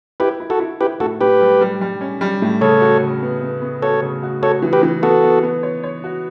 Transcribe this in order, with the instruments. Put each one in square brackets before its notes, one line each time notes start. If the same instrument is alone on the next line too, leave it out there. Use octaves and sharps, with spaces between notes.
[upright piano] E4 [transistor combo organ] G4 B4
[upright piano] E4
[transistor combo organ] F#4 A4
[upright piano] E4
[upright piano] E4 [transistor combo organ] G4 B4
[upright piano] A2 [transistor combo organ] F#4 A4
[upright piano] A2 [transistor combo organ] G4 B4
[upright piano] G3
G3
G3
C#4
G3
A2
[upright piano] C#3 [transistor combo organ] A4 C#5
[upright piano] F#4
C#3
B3
B3
B3
[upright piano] F#4 [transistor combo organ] A4 C#5
[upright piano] C#3
F#4
[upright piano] F#4 [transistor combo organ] A4 C#5
[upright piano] E3
[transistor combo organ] G4 B4
[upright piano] E3
[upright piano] B3 [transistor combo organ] F#4 A4
[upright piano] B3
B3
C#5
C#5
F#4